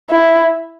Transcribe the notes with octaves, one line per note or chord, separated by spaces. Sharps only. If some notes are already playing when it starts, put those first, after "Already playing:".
E4